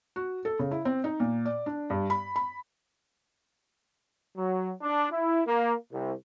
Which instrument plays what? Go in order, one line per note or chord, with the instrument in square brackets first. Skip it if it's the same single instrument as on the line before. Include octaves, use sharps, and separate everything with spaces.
[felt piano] F#4
A4
C#3
E4
C4
D#4
A#2
D5
D4
G2
B5
B5
[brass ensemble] F#3
D4
E4
A#3
C2